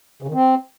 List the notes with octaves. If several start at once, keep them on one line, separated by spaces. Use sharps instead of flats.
C#3
D#3
C4